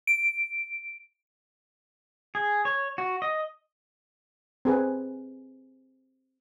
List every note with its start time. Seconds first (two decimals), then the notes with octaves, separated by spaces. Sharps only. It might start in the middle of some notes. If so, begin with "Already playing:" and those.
0.07 D7
2.35 G#4
2.65 C#5
2.98 F#4
3.22 D#5
4.65 C4 G#4 B4